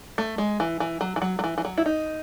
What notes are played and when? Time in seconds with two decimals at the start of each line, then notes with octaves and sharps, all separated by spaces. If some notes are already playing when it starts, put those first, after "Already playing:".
0.18 A3
0.38 G#3
0.60 E3
0.80 E3
1.01 F#3
1.16 E3
1.22 F#3
1.39 F#3
1.44 E3
1.58 E3
1.65 F#3
1.78 E4
1.86 D#4